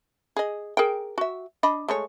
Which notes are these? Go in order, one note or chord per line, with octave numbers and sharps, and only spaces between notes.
G#4 D#5
G#4 A#4 G5
F#4 E5
D4 D#5 B5
G#3 A3 C#5